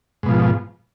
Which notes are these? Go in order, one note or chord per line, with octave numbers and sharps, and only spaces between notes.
G#2 B2 F3